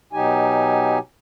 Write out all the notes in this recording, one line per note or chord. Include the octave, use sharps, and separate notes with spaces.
B2 F#3 D#4 G4 G#5